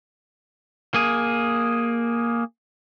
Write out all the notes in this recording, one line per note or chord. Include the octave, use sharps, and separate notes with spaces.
A#3 G#4